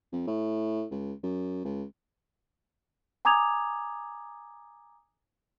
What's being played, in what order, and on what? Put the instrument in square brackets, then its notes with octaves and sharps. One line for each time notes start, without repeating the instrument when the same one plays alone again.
[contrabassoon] F2
A2
C#2
F#2
C#2
[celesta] G#5 A#5 D6 D#6 G#6 F7